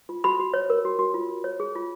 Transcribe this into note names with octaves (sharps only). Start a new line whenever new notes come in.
F4
F#4 B5
F#4
C#5
A#4
F#4
F#4
F4
F4
C#5
G#4
F4